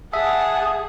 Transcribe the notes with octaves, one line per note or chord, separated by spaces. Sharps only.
G#4 E5 F#5 A5 D#6